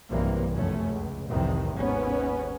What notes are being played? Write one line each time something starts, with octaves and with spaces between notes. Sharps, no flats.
B1 G2 C3 E3 A#3
F1 B1 F#2 A3 C#4
C#2
C2 F2 A2 C3 D#3 E3
G#1 D#2 G#2 B3 C#4